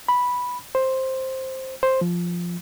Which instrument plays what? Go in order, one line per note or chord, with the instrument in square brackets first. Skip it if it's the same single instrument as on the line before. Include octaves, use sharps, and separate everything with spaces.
[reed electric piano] B5
C5
C5
F3